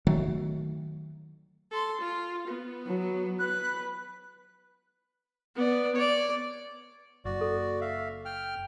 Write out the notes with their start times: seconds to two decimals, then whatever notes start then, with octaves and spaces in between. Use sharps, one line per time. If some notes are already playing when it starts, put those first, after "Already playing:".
0.07 D#3 F#3 A3
1.71 A4 C6
2.01 F4
2.48 B3
2.87 F#3
3.39 B4 F#6
5.55 B3 D5
5.96 C#5 D5
7.25 F#1 F#4 D5
7.41 A4
7.81 E5 F5
8.25 G5 F6